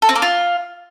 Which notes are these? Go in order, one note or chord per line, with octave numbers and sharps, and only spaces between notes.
A4
C4
A#3
F4